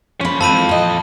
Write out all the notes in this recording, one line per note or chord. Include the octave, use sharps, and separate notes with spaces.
F3 A#3 C#4 B5
E3 F3 G#3 C4 A4 A5 B5 D#7
A#2 D#5